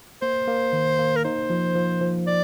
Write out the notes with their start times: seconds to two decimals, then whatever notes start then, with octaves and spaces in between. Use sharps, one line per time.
0.22 A#3 C5
0.48 A#3
0.73 D#3
0.99 A#3
1.16 A#4
1.24 D#4 C5
1.50 F3
1.75 F3
2.01 F3
2.27 D5